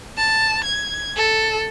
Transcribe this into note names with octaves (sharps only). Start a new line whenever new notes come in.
A5
G#6
A4